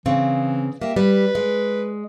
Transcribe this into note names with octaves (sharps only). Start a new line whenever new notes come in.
C#3 E3 C4
A#3 G4 E5
G3 B4
G#3